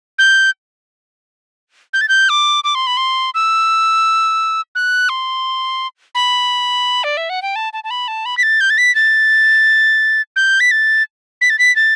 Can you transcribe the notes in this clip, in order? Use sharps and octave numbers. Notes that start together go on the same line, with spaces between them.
G6
G6
A6
G6
D6
D6
C6
B5
C6
E6
F#6
C6
B5
D5
E5
F#5
G5
A5
A5
A5
B5
A5
B5
B6
A6
G6
A6
B6
A6
G6
B6
A6
B6
A6
B6
A6